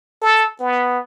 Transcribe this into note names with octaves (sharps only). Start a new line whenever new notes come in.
A4
B3